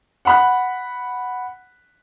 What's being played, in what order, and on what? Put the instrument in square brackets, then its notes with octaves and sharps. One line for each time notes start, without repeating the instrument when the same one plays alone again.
[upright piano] F#5 B5 F#6